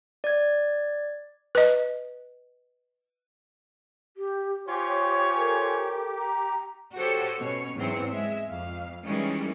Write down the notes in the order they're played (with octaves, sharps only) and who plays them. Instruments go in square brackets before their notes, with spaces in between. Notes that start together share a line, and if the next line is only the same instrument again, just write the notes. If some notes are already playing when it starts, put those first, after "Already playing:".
[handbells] D5 G#6
[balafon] B4 D#5
[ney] G4
[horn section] F4 C5 C#5 [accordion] G4 [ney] G#5
[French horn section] A4 A#4
[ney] A#5
[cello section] F#4 G4 A4 C5 C#5
B2 C#4 C#5
E2 G#2 F#3 C4 C#5
G#3 E5
F2 F5
D#3 E3 G3 G#3 C#4